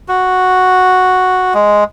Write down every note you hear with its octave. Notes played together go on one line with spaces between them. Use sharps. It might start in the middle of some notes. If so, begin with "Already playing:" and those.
F#4
G#3